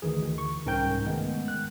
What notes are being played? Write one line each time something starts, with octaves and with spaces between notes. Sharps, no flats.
D2 D#3 E3 G#4
C#6
C2 G#2 C#4 A#4 G5 G6
D#3 G#3 A3 B3
F#6